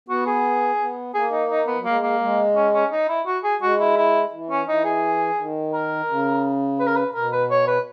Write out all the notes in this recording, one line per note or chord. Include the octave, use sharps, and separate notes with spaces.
B3 F#4
G#4
B3
A#3 G#4
D#4
D#4
E3 B3
F#3
G#3 A#3
A#3
G#3
C#4
C#4
D#4
E4
F#4
G#4
G#3 F#4
E4
E4
E3
C#4
E3 D#4
G#4
D#3
A#4
C#3
B4
A#4
B4
B2 A#4
B4
C#5
B4